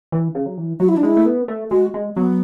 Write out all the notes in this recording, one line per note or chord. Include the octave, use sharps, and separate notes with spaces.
E3
C#3
F#3
E3
F#3 F#4
E4
D4
G#3 E4
A3
B3
A3
G#3 F#4
G#3
F#3 B3